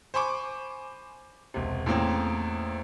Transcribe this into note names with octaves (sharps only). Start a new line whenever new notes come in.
C5 G#5 B5 C#6 D6
E1 C3
E2 A2 A#3 C4 C#4